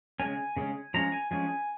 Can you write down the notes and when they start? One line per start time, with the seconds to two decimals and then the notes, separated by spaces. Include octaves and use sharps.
0.20 C#3 G#3 C#4 G#5
0.57 C#3 G#3 C#4
0.94 F3 G#3 C#4 A#5
1.12 G#5
1.31 F3 G#3 C#4 G#5